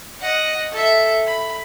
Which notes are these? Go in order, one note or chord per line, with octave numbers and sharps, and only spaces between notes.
D#5 F#5
A4 E5
B5